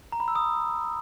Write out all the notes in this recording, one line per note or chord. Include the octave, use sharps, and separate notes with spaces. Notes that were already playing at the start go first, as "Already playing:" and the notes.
A#5
B5
E6
D#6